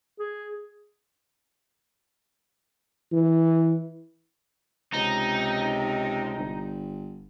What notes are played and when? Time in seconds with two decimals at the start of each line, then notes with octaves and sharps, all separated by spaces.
0.20 G#4
3.12 E3
4.94 C#2 C3 D#4
6.36 G1